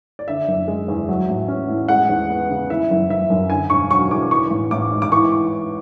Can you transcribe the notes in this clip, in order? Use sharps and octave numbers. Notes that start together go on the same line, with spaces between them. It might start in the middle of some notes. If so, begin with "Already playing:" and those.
D5
D3 E5
F#1
G#3
E2
F#3
A1
C#4
A2
G#3 F#5
E2
B3
C#3
E3 E5
F#1
F#1 E5
F#2
D3 G#5
E1 C#6
F#3 C#6
E2 D6
E3 C#6
A1
A1 D6
G#2
D6
E3 C#6